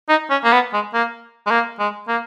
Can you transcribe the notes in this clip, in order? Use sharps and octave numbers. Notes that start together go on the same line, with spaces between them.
D#4
C#4
A#3
B3
G#3
A#3
G#3
A#3
G#3
A#3